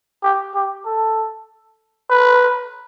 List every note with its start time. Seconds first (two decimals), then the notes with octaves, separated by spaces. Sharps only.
0.24 G4
0.55 G4
0.86 A4
2.10 B4